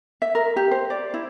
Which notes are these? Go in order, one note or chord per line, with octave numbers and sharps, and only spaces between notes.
E5
A#4
G4
C5
D5
E4